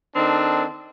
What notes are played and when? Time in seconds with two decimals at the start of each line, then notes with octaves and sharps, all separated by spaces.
0.15 D#3 C4 D4 A4